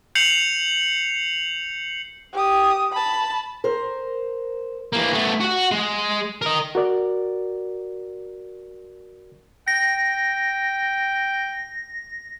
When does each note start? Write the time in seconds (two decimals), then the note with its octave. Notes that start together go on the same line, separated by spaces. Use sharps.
0.15 G6 C7 C#7 F7 F#7
2.33 G4 D#6
2.92 A5 B5
3.64 A#4 C5
4.93 E3 A#3
5.13 A3 B3
5.41 F#4 F#5
5.72 G#3
6.42 A#4 D#5
6.75 F#4 A#4 D5
9.68 G5 A#6